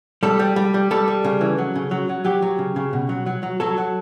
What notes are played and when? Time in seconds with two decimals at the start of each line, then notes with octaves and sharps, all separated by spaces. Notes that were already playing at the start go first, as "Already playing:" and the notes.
0.23 G3 A4
0.39 G3
0.56 G3
0.74 G3
0.91 G3 A4
1.08 G3
1.24 C#3
1.41 E3
1.58 F#3
1.75 C#3
1.91 F#3
2.09 F#3
2.25 F#3 G4
2.42 F#3
2.59 C#3
2.76 C#3
2.93 B2
3.09 F#3
3.26 F#3
3.43 F#3
3.60 F#3 A4
3.78 F#3